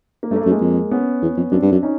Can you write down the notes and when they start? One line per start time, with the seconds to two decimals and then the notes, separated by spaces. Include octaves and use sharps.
0.23 A#3
0.31 G2 A3
0.36 A#3
0.41 F#2 A3
0.51 G#3 A#3
0.61 F2
0.91 B3 C#4
1.22 E2
1.37 F2
1.51 F#2 C4 D4
1.62 G2
1.72 F#2
1.83 C#4 D#4